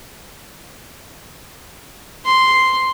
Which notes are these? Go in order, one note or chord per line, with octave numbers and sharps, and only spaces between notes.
C6